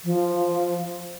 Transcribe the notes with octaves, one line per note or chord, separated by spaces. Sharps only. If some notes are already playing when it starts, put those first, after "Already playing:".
F3